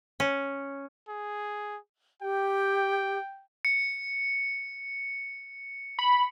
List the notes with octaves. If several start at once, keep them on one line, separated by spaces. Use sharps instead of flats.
C#4
G#4
G4 G5
C#7
B5